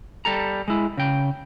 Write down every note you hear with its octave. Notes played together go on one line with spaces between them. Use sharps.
G3 A4 A#5
G#3 E4
C#3 G5